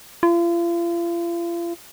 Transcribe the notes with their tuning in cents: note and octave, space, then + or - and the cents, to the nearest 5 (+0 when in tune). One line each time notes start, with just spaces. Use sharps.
F4 -40